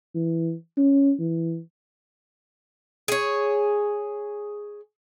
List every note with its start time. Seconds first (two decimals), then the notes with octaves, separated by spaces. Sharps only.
0.15 E3
0.77 C#4
1.19 E3
3.08 G#4 C#5